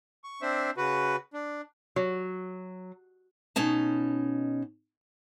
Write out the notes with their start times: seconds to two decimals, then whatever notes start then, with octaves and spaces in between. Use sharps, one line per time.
0.24 C#6
0.42 C4 D4 C5 E5
0.77 C#3 F#4 B4
1.34 D4
1.96 F#3
3.56 B2 C#4 D#4 A5